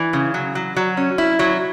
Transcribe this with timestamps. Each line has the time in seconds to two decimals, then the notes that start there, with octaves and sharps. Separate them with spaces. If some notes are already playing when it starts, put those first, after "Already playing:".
Already playing: E3
0.13 C#3
0.34 F#3
0.55 F#3
0.76 F#3
0.97 C#4
1.18 E4
1.39 F#3